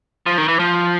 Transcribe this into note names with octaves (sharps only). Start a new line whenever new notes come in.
F3
D#3
E3
F3